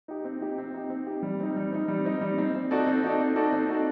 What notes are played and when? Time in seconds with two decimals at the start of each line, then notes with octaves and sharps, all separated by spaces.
0.08 D#4 G4
0.25 C4
0.41 D#4 G4
0.58 C4
0.74 D#4 G4
0.90 C4
1.07 D#4 G4
1.22 G3
1.40 C4 D#4
1.56 G3
1.72 C4 D#4
1.88 G3
2.05 C4 D#4
2.21 G3
2.38 C4 D#4
2.55 C4
2.71 D#4 F#4 A4 D5
2.87 C4
3.03 D#4 F#4 A4 D5
3.20 C4
3.36 D#4 F#4 A4 D5
3.53 C4
3.69 D#4 F#4 A4 D5